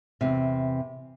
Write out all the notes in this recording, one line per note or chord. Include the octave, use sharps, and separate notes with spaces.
E2 C3